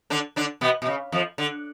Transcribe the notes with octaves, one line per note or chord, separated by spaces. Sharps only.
D3 D4
D3 D4
B2 B3
B2
C#3
F2 F3
D3